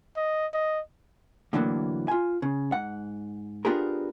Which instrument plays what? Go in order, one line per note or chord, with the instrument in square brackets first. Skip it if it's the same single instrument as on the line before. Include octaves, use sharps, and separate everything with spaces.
[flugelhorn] D#5
D#5
[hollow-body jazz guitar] A2 D3 E3 F#3 A#3
F4 G#5
C#3
G#2 F#5
B3 D4 F4 G4 G#4 A#4